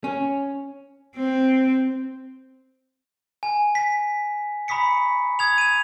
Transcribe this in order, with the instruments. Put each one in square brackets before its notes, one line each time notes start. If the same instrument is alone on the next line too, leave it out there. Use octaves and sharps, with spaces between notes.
[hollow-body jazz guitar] C#4
[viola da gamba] C4
[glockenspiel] G#5
B6
A#5 B5 C#6 D#6 B6 C#7
D#6 G#6 F7
D#7 F7